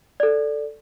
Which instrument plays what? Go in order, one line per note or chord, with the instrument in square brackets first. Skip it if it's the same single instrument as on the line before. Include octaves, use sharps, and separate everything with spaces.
[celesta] A4 D5